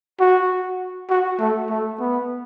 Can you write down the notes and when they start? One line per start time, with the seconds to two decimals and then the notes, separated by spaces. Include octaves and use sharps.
0.20 F#4
1.10 F#4
1.39 A3
1.70 A3
1.99 B3